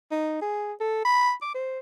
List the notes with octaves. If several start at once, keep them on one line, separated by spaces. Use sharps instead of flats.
D#4
G#4
A4
B5
D6
C5